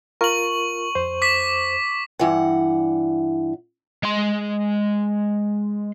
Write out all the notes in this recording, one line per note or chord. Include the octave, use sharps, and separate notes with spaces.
F4 A#4 C#6 F#7
F2 C5
D6 B6
G2 E3 F#5
G#3 C6